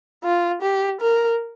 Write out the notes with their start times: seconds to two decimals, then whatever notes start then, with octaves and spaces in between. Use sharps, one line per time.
0.24 F4
0.62 G4
1.01 A#4